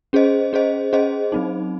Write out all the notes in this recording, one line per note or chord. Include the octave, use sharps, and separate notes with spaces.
C#4 G#4 C5 D#5
C#4 G#4 C5 D#5
C#4 G#4 C5 D#5
F#3 C4 D#4